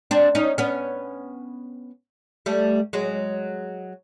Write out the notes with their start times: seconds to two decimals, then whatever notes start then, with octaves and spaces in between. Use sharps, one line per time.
0.11 C4 D4
0.35 C#4 D#4
0.58 B3 C#4
2.46 G3 A3
2.93 F#3 G#3